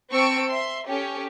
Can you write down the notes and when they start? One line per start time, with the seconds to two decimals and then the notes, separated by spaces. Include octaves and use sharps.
0.12 C4 A5 C#6 E6 C#7 D7
0.50 E5 C6
0.88 C#4 G4 A4 C#5